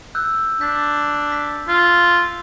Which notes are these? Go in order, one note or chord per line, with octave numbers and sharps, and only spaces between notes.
E6 F#6 G6
D4 G6 B6
B6
F4